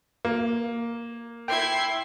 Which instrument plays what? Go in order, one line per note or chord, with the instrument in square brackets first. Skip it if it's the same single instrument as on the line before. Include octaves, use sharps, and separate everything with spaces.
[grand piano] A#3
[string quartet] E4 C6 G#6 [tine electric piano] G5